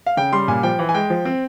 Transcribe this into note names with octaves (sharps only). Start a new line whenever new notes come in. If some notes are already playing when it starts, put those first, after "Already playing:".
F5
C#3 G5
G3 C6
A#2 G#5
F3 G5
E3
G#5
G#3 G5
F3
C4